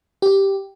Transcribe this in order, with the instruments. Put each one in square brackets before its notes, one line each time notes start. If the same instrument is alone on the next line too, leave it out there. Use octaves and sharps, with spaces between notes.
[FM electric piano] G4